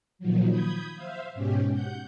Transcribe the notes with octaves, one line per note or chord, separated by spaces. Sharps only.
A#2 D#3 F3 F#3
B5 D#6 G6 G#6
C5 E5 F5
G#2 B2 C#4 G4
F#5 G6